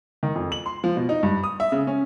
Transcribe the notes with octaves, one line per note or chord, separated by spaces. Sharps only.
D#3
F2
F#7
C6
F3
B2
D#4
G2
D#6
E5
C#3
C#4